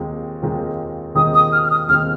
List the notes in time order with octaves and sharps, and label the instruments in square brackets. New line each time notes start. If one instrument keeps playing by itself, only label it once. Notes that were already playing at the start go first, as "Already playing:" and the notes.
Already playing: [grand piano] D#2 D#3 G#3 C4 F4
D#2 D#3 G#3 C4 F4
[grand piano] D#2 D#3 G#3 C4 F4 [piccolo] D#6
[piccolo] D#6
F6
F6
D#6
[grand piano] D#2 D#3 G#3 C4 F4 [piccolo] F6